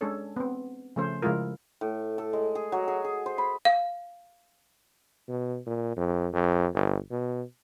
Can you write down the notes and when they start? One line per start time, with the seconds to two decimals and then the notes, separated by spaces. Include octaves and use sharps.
0.01 G#3 C#4 D4 G#4 A4 C#5
0.36 B3 C4
0.96 C#3 F3 A3 C#4 C5
1.22 C#3 F3 G#3 E4 F4 A#4
1.81 A2
2.18 A4
2.33 G#3
2.55 G#4
2.72 F#3
2.88 G#4
3.05 G#4
3.26 C5
3.38 B5
3.65 F5
5.29 B2
5.67 A#2
5.97 F2
6.33 F2
6.74 G1
7.11 B2